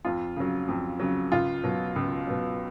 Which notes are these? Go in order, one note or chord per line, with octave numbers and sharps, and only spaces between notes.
F2 F4
C#3 F#3
F2
C#3 F#3
C#2 F4
B2 F#3
C#2
B2 F#3